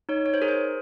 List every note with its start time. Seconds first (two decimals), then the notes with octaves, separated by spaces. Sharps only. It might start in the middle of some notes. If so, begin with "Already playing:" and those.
0.09 D#4 C#5
0.26 C#5
0.34 C5
0.42 G#4 A#4
0.48 C5